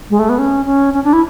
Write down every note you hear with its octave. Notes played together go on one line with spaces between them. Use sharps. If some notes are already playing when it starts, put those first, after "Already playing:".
G#3
A3
B3
C#4
C#4
C#4
D4
E4